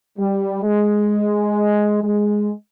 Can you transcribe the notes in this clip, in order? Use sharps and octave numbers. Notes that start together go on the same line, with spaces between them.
G3
G#3
G#3